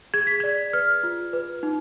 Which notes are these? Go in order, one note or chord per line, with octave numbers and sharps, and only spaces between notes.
G#4 G#6
B6
D5 G#6
B4 F6
F4
B4
D#4